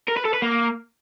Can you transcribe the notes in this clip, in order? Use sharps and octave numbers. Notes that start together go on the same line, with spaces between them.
A#4
B4
A4
B4
A#3